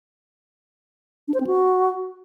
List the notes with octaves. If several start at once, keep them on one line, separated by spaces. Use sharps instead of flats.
D4
C5
C4
F#4